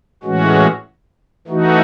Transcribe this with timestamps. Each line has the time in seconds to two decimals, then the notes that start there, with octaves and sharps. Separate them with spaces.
0.23 A2 E3 G#3 C#4 F#4
1.48 E3 A3 D#4 F#4